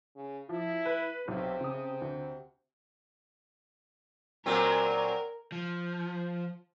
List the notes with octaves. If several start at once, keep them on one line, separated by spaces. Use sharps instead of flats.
C#3
F3 E4
B4
B1 C3
C#3 D#6
D2
A#2 F#3 C4 A#4
F3